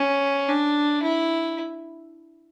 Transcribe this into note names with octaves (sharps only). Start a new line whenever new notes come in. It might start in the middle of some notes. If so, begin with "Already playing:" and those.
Already playing: C#4
D4
E4